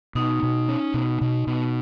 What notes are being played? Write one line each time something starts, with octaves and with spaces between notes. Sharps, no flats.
B2 D#4
B2
C#4
B2
B2
B2